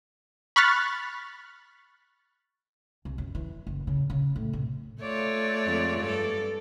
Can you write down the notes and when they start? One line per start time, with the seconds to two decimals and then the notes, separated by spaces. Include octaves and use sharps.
0.56 B5 C#6 F6 F#6 A6 B6
3.05 C2
3.18 F#2
3.35 E3
3.67 F#1
3.87 C#3
4.10 C#3
4.36 A2
4.53 C3
5.02 A3 F4 C#5 D5
5.66 F2 G#3
6.02 G2 A4